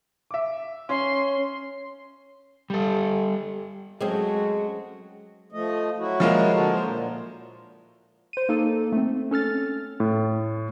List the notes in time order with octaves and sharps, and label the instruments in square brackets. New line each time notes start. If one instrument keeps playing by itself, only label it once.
[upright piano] E5 D6
[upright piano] C#4 [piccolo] C6
[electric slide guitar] G3 A4
[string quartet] F#3 A3 F#4 [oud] G#3 C4 C#4
[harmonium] F3 A3 D#5
F#3 E4 F#4
[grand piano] F3 G#3 A#3
[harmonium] D3 F#4 A4
A#4 C5
A#2
[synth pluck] C5 D#7
A#3 D#4 A4
A3 C4
C#4 A4 F6 A6
[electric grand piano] A2